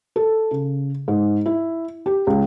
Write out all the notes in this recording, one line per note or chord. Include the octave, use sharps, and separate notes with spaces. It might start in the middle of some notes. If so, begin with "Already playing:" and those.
A4
C#3
G#2
E4
G4
C#2